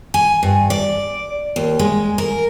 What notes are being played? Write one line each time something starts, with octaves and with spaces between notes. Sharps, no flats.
G#5
G2
D5
D#2
G#3
A#4